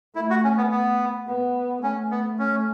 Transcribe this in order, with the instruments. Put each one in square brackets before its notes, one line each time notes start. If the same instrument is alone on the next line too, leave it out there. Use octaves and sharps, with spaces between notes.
[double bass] A3 [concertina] E4
[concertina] F#4
C#4
B3
B3
[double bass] B3
[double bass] A3 [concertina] C#4
[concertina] B3
C#4